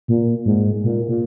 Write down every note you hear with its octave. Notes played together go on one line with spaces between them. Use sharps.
A#2
G#2
A#2
A#2